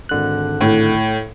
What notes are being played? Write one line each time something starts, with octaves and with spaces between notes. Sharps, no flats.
G#1 D3 F#6
A2